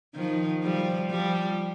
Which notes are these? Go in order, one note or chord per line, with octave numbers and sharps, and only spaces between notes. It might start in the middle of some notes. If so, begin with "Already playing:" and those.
D#3 F3
F3 G3
F3 G3